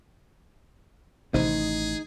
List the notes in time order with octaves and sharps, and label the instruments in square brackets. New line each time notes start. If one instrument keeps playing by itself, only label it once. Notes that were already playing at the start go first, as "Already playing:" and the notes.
[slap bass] A1 D#3 [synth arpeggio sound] C3 [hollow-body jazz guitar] D#4 [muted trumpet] G#4